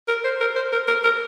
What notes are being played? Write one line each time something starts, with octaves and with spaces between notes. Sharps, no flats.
A#4
C5
A#4
C5
A#4
A#4
A#4